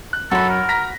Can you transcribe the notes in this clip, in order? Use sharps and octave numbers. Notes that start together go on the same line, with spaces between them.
F#6
F#2 F#3 F#4 A4 B5
A#4
A#5 A#6 B6